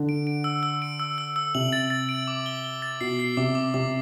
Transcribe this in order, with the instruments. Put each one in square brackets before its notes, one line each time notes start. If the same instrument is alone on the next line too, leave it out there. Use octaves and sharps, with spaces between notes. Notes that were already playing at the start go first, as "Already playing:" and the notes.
Already playing: [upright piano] D3
[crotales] D7
D7
E6
E6
D7
E6
E6
E6
[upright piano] C3 [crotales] F#7
[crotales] A6
A6
D7
D6
G7
G7
A6
[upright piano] B2 [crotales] C7
[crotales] C7
[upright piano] C3 [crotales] D6
[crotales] D6
[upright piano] C3 [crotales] D6